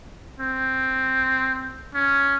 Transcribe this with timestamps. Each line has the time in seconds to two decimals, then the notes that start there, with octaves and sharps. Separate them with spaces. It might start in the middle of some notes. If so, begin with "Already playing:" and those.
0.40 C4
1.94 C#4